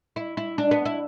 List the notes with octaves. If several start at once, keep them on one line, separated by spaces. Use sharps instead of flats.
E4
E4
D4
B3
E4